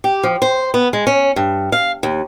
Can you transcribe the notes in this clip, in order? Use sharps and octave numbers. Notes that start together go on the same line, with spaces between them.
G4
F3
C5
B3
G#3
C#4
G2
F5
D#2